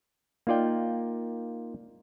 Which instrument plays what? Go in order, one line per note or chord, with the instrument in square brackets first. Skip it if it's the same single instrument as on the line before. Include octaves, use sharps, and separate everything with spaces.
[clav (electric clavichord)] A#3 D#4 F4 D5 G5